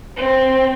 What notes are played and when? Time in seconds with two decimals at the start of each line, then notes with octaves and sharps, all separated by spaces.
0.16 C4